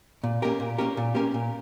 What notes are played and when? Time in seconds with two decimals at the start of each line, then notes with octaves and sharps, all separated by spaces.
0.24 A#2
0.42 A#3 C#4 G4 A#4
0.60 A#2
0.78 A#3 C#4 G4 A#4
0.97 A#2
1.15 A#3 C#4 G4 A#4
1.34 A#2